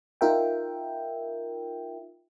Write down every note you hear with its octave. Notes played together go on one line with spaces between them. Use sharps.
D#4 F4 A#4 E5 G5